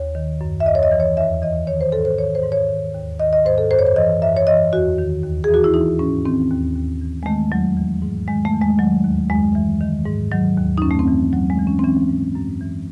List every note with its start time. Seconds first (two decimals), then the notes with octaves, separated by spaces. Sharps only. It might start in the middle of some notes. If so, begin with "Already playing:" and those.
Already playing: D#2 C#5
0.15 D#3
0.41 F#2
0.60 E5
0.66 D#2 D#5
0.75 C#5
0.83 D#5
0.92 E3
1.00 C#5
1.17 E2 E5
1.42 E3 D#5
1.67 D#3 C#5
1.81 C5
1.92 G#2 A4
2.05 C5
2.18 D#3 C#5
2.35 C5
2.44 G#2
2.52 C#5
2.69 D#3
2.94 D#2
3.20 D#3 D#5
3.33 D#5
3.46 G#2 C5
3.58 A4
3.71 F#2 C5
3.79 C#5
3.87 C5
3.96 E3 D#5
4.21 F#2 E5
4.37 C#5
4.47 E3 D#5
4.73 E2 F#4
4.98 D#3
5.23 D#2
5.44 E3 G#4
5.54 F#4
5.64 E4
5.74 E3 D#4
5.99 G#2 C#4
6.25 D#3 C4
6.50 D#2
6.76 D#2
7.01 E3
7.23 G#3
7.26 D#3 A3
7.52 E2 F#3
7.77 E3
8.02 G#2
8.28 D#3 G#3
8.45 A3
8.53 E2
8.62 G#3
8.79 D#3 F#3
9.04 D#2
9.30 F#2 G#3
9.55 E3
9.80 D#3
10.06 G#2
10.32 D#3 F#3
10.57 D#2
10.78 D#4
10.82 F#2 C#4
10.91 A3
10.99 C4
11.08 E3
11.33 D#2 F#3
11.50 G#3
11.59 E3
11.67 C#4
11.79 C4
11.84 E3 C#4
12.09 G#2
12.35 F#2
12.61 E3